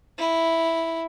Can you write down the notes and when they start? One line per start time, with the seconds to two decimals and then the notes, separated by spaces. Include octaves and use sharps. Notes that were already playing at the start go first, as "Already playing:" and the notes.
0.18 E4